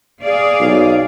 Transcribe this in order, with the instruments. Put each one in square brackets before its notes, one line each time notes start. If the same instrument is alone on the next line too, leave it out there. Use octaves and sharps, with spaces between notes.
[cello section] G#4 D5 F5
[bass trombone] B1